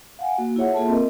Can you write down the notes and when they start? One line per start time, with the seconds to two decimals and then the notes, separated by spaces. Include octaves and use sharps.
0.19 F5 F#5 G#5
0.38 A#3 F#4
0.56 E4 F4 G#4 C#5 E5 F#5
0.74 A#3 F4 G#4 A4 E5 A5
0.88 C4 A#4 D#5